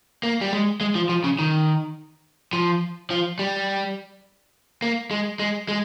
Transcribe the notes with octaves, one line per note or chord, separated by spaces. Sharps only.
A#3
G3
G#3
G#3
F3
F3
C#3
D#3
F3
F3
G3
A#3
G#3
G#3
G#3